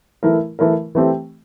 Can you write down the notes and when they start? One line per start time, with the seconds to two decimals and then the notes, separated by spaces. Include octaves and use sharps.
0.23 E3 A3 E4 A#4
0.59 E3 A3 E4 A#4
0.95 E3 A3 C4 G4